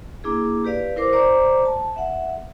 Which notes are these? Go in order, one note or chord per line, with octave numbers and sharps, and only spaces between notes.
A#3 D4 E4 G#4
G4 B4 D5 F5
E4 A#4 C5 D6
C5 D5 A#5 D6
A5
E5 F#5